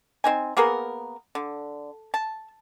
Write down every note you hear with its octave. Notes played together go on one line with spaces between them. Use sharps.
C4 D#4 G#5
A#3 B3 G#4 A#4
D3
A5